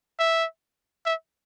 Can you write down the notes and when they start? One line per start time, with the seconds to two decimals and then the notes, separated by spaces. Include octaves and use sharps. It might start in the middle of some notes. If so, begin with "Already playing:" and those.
0.19 E5
1.06 E5